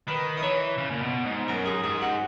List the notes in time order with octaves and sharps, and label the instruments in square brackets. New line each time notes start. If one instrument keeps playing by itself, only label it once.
[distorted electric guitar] D#3 [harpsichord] B4
[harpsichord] D#5
[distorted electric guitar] E3 [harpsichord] C#5
[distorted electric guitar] C#3
A#2
B2
G#2
[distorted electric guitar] F#2 [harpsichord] A#4
[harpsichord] G#4
[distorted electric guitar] G#2 [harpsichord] G#4
[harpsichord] F#4